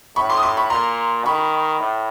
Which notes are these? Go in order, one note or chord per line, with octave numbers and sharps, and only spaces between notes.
A2 B5 C#6
C6 D6
D#6
C6 D6
B5 C#6
A#2 A#5 C6
D#3 B5 C#6
A2